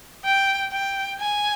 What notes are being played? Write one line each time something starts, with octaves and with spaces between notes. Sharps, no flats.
G5
G5
G#5